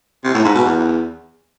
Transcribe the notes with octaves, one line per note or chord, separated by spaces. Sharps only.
C3
A2
G#2
B2
E2